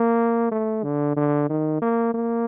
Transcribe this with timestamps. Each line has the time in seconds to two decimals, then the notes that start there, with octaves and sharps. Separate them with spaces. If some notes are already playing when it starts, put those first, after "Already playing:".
Already playing: A#3
0.52 A3
0.84 D3
1.16 D3
1.49 D#3
1.82 A#3
2.14 A#3